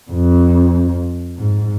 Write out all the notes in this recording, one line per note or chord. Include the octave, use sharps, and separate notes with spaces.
F2
G#2